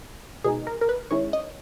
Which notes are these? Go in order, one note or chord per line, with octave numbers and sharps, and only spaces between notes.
B2 G#3 D#4 G#4
A#4
A#4
B4
D#3 G#3 C#4 E4 C#5
D#5